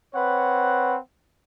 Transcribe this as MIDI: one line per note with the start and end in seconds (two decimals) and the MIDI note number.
0.15 0.97 60
0.15 0.97 71
0.15 0.97 73
0.15 0.97 78